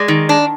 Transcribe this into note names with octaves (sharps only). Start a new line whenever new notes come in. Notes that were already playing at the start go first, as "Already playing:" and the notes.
Already playing: G#3 D5
D#3
D4